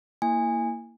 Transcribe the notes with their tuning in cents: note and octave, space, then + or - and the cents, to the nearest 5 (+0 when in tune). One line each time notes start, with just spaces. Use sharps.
A#3 +0 E4 +0 G#5 -20